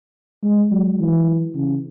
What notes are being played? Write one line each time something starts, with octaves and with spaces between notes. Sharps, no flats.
G#3
F#3
E3
C#3